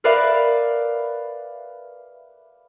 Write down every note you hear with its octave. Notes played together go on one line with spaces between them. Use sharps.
A#4 B4 D5 E5 F5 B5